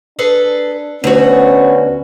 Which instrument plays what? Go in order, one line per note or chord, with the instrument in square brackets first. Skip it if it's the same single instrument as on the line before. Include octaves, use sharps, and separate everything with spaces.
[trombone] D4 [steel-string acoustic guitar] G#4 A4 B4
[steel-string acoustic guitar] D2 F#4 [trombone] B3 [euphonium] C#4